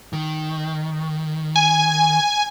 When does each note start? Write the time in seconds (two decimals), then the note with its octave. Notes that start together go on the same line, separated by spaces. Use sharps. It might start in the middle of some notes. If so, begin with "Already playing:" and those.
0.13 D#3
1.56 G#5